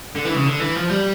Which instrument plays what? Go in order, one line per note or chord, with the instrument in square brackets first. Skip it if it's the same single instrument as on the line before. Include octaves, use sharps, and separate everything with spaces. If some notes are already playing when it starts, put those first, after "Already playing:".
[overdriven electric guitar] D3
E3
C#3
D3
E3
F3
G3